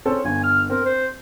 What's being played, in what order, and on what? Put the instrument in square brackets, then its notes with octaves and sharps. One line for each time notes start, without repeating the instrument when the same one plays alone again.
[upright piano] C4 C#4 A4
[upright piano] G1 [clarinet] G#5
[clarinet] F6
[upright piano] C4 [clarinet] A#4
[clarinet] C5